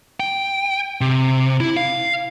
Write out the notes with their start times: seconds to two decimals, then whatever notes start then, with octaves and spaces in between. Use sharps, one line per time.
0.20 G5
1.01 C3
1.60 E4
1.77 F5